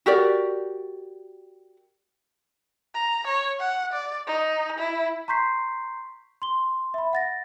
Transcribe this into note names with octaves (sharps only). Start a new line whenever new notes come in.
F#4 G4 A#4 D5
A#5
C#5
F#5
D5
D#4
E4
A#5 C6 C#6 G6 B6 C7
C6 G7
E5 B5
F#5 A6 A#6